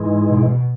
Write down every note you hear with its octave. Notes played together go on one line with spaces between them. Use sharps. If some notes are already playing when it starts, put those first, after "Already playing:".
Already playing: G#2 E3 G#3
B2